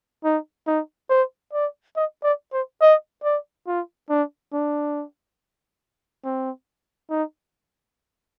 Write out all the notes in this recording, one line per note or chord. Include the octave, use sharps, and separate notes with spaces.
D#4
D#4
C5
D5
D#5
D5
C5
D#5
D5
F4
D4
D4
C4
D#4